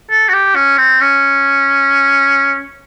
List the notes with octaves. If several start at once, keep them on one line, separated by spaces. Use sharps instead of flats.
A4
F#4
G4
C#4
C4
C#4